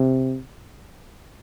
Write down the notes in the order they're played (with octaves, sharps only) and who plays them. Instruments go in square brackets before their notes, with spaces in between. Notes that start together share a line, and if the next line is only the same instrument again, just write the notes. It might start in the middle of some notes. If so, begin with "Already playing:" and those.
Already playing: [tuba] C3